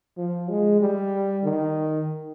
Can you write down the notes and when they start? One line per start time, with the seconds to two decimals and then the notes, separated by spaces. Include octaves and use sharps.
0.18 F3
0.49 G#3
0.81 G3
1.44 D#3